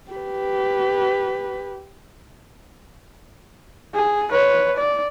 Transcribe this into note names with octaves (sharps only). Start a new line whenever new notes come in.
G4 B4
G#4
B4 C#5
D5